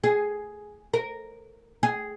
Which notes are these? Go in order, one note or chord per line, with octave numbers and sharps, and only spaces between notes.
G#4
A#4
G#4